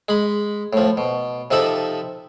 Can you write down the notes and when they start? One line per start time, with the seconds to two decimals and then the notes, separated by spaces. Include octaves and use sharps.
0.09 G#3 B5
0.73 A2 F3
0.97 B2
1.51 C3 F3 D#4 A4 E5 B5